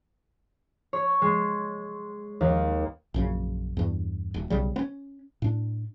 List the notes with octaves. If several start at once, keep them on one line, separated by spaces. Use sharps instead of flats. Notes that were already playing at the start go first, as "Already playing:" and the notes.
C#5
G#3
D#2
A#1 F#2 C#3
E2 G2
D#1
B1 C#3 G3
B3 C#4
A2 D4